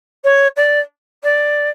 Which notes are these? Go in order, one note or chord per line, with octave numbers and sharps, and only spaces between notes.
C#5
D5
D5